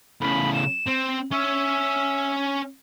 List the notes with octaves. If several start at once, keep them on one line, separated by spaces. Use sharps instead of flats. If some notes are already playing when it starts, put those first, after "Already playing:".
A2 C#3 B5
E7
C4
C#4 C#5 E5